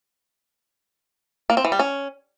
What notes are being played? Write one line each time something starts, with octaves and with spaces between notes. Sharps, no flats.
A#3
C4
E3
G3
C#4